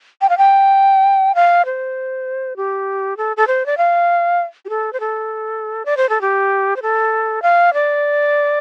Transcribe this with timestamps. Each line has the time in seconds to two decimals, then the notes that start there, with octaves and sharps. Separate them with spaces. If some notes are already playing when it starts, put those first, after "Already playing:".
0.21 G5
0.29 F5
0.38 G5
1.35 F5
1.65 C5
2.57 G4
3.17 A4
3.37 A4
3.47 C5
3.66 D5
3.78 F5
4.65 G4
4.69 A4
4.93 C5
5.00 A4
5.86 D5
5.97 C5
6.09 A4
6.21 G4
6.76 C5
6.82 A4
7.42 F5
7.74 D5